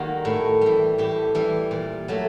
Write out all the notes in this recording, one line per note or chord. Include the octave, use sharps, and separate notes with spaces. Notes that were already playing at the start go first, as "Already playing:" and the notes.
Already playing: D#3 G3 A#3 F#4
A2
E3 G3
A2 G4
E3 G3
A#2
F#3 A3